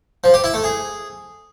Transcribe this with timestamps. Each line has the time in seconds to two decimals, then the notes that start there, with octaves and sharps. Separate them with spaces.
0.24 F3
0.34 G4
0.44 E4
0.54 A3
0.64 G#4